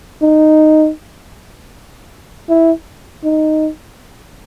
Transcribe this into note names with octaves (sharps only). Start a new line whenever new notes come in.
D#4
E4
D#4